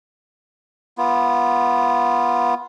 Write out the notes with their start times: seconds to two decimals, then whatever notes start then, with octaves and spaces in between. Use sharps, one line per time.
0.98 B3 F4